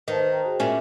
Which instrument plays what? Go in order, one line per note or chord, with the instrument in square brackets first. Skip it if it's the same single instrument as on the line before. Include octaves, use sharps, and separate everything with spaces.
[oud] D#3 [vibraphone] B4 C5 A5
[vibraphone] C5 G5 A#5
F#4 G#4
[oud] A#2 C#4 [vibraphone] E5